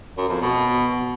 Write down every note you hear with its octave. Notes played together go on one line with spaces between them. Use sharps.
F#2
F2
B2